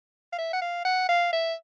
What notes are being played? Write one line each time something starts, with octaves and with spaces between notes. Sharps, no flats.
F5
E5
F#5
F5
F#5
F5
E5